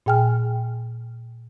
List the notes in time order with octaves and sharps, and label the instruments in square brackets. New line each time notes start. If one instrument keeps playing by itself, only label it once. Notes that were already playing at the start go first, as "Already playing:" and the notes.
[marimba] A#2 G#4 G5 G#5 F6